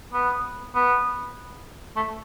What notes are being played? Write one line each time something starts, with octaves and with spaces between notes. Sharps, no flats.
B3
B3
A3